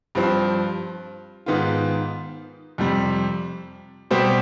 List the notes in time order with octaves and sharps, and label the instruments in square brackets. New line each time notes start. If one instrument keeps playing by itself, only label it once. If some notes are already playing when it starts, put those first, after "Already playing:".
[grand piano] G2 F3 C4
G#2 D#3 B3 F4
F2 C3 G3
B2 G3 C4 G4 C5